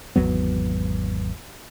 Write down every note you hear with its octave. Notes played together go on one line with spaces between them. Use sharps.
G#1 E2 F#3 B3